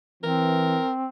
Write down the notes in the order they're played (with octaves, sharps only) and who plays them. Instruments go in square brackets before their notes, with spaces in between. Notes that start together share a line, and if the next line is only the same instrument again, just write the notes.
[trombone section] E3 [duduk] C4 [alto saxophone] A#4